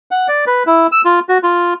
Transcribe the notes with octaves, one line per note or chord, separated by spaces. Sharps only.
F#5
D5
B4
E4
E6
F4
F#4
F4